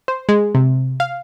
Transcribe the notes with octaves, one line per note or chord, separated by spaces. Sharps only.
C5
G#3
C3
F5